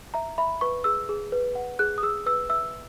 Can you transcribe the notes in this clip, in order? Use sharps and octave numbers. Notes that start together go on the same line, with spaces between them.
E5 A#5
E5 B5
B4 C#6
G#4 E6
G#4
B4
F#5
G#4 F#6
D#6
G#4 E6
B4 E6
E5 E6